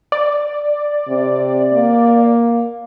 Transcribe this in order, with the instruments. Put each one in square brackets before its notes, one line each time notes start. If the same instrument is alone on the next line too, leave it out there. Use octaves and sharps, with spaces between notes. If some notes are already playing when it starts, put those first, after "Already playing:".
[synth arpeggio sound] D5
[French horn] C3
A#3